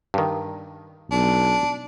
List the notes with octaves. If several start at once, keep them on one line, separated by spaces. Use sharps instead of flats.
G2 D#3
B1 D4